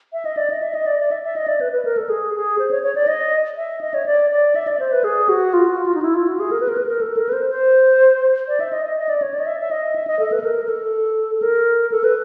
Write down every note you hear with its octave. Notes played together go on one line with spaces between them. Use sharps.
E5
D#5
D5
D#5
E5
D#5
D5
D5
E5
E5
D#5
D5
B4
B4
A#4
A4
G#4
G#4
C5
C#5
C#5
D5
D#5
E5
D#5
C#5
D5
D5
E5
D5
C5
B4
G#4
F#4
F4
F#4
F4
D#4
E4
F4
F#4
G#4
A#4
B4
A#4
B4
A#4
A4
A#4
B4
C5
C5
D5
E5
D#5
D#5
D#5
D5
C#5
D5
D#5
E5
E5
D#5
E5
D#5
A4
B4
A4
A#4
A#4
A4
A4
A#4
A4
B4